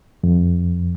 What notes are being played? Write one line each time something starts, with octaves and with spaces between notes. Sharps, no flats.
F2